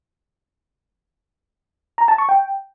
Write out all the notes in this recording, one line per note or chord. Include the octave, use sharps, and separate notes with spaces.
A#5
A5
C#6
G5